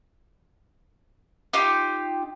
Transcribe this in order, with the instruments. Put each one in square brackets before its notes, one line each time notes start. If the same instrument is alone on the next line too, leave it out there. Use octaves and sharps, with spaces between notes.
[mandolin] D#4 F4 G4